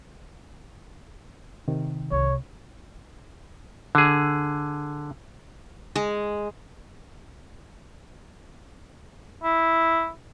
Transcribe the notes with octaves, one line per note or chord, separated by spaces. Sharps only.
C3 D#3
C2 C#5
D3 G#4
G#3
E4